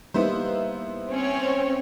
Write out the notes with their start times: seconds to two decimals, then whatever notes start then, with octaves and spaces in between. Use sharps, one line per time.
0.14 G3 A#3 B3 D#4 E4 C5
1.09 C4 C#4 C#5